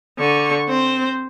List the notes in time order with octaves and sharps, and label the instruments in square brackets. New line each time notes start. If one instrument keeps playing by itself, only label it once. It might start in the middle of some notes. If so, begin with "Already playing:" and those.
[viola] D3 C#6
C4 C5